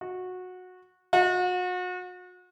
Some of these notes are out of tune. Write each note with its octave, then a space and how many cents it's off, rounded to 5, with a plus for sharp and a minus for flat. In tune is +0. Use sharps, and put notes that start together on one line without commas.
F#4 -15
F#4 -35